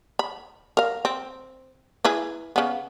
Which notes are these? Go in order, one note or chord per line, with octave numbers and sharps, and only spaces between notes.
B5
A#4 F5
C4
E4 G#4 B4
C#3 B3